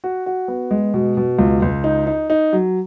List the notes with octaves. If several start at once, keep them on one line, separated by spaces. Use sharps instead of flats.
F#4
F#4
B3
G#3
B2
B2
C#2
C#2
D#4
D#4
D#4
F#3